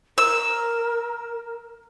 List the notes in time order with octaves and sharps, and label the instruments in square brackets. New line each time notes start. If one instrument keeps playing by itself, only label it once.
[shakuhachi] A#4 [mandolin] E6